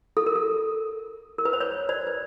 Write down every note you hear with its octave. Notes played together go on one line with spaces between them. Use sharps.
A4
A#4
A4
A#4
B4
C5
B4 C#5
C5 D5
B4